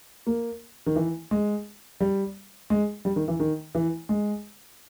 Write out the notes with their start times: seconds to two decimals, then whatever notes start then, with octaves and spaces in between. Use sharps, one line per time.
0.27 A#3
0.86 D#3
0.96 E3
1.31 G#3
2.00 G3
2.70 G#3
3.05 G3
3.16 D#3
3.28 E3
3.40 D#3
3.75 E3
4.09 G#3